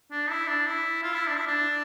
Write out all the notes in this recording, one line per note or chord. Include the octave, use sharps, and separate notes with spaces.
D4
E4
D4
E4
F4
E4
D4
E4
D4